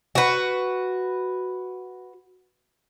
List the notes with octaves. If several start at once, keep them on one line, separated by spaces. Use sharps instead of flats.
F#4 B4